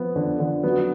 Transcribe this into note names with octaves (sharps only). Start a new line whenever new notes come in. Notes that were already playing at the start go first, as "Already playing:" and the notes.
Already playing: F3 B3
D3
D3
F#3 B3